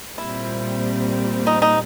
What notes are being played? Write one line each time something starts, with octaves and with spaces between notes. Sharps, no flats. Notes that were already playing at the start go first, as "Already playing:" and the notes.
A#2 G3 C4 E4
D#4
D#4